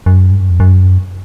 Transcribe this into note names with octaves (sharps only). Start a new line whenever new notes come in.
F#2
G2
F#2
F2
F#2